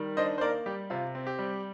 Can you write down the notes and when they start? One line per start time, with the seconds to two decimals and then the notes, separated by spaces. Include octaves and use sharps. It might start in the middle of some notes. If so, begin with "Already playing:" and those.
Already playing: D#3 G3
0.17 D4 C5 D#5
0.38 C5
0.41 A#3 A#4 D5
0.66 G3 G4
0.90 C3 F4
1.15 C4
1.27 G4
1.39 G3